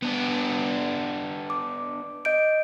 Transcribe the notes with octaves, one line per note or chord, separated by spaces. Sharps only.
B3 D4
D6
D#5 G6 D7